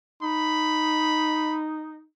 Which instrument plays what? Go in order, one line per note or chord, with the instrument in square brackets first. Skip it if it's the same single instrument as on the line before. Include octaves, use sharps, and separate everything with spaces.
[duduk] D#4 [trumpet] B5